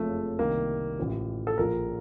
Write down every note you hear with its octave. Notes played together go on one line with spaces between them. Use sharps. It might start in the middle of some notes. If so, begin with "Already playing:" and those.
Already playing: F#1 F2 C#3 F3 A3
C2 C3 D#3 A#3
A1 A2 F3
A4
A#1 A#2 F3 A#4